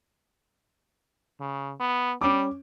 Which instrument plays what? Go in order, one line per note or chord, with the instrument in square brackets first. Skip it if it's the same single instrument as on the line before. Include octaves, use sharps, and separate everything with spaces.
[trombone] C#3
B3
[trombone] G3 [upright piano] C#4 D6